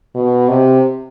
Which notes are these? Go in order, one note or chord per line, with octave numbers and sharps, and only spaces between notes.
B2
C3